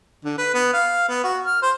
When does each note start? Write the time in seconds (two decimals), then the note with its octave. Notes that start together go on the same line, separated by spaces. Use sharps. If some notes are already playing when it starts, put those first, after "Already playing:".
0.25 D3
0.38 B4
0.54 B3
0.73 F5
1.09 B3
1.24 F#4
1.45 F6
1.62 C5